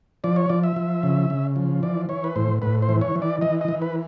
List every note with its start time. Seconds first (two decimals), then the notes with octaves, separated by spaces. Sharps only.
0.24 F3 D5
0.36 C#5
0.49 F3 D5
0.64 E5
0.76 F3
1.03 C#3
1.30 C#3
1.56 F3
1.83 E3 D5
2.09 E3 C#5
2.24 B4
2.36 A2 C5
2.62 A2 B4
2.82 C5
2.89 E3
3.01 C#5
3.16 E3
3.22 D5
3.41 E3 D#5
3.61 D#5
3.68 E3
3.82 B4